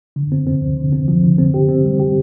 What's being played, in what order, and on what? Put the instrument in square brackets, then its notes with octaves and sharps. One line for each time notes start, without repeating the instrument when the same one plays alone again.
[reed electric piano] D3
C4
C4
D2
D3
C4
F3
D3
C4
G4
C4
G3
G4